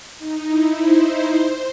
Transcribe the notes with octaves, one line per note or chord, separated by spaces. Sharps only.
D#4
E4
C5
C5